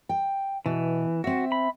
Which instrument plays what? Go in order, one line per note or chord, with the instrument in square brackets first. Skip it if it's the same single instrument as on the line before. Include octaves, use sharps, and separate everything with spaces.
[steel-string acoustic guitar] G5
[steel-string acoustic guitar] B2 [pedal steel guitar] E3
[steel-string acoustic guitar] C4 E5 [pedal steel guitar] F#4
[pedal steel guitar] B5